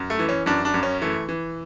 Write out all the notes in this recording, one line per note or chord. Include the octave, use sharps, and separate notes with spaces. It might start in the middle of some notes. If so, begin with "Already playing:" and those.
Already playing: F#2
A3
E3
C#4
F#2 D4
D4
F#2
C#4
E3 A3
E3